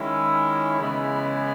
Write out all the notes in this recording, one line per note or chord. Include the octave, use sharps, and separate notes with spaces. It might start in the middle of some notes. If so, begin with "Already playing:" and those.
Already playing: D#3 G#3 C#4 E4
C#3 E3 G#3 B3 E4 B5